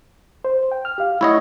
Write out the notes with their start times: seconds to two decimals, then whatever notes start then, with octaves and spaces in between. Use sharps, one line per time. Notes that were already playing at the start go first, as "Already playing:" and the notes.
0.45 C5
0.72 G5
0.85 F6
0.98 G4 F5
1.21 A3 E4 C#5 D#5 F#5 C#6